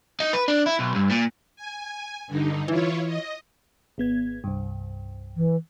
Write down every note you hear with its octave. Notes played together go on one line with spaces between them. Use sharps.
D#4
B4
D4
E4
B1
G2
A#2
G#5
G2 D3 D#4
E3 E4 F4 C#5
D#5
G#1 B3 G#6
C2 G2
E3